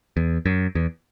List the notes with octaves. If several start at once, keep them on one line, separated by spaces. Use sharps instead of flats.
E2
F#2
E2